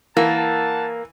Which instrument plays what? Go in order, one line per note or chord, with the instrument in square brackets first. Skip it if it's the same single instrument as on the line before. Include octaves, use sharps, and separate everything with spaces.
[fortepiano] E3 [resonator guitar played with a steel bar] A#3 [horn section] F#5 A5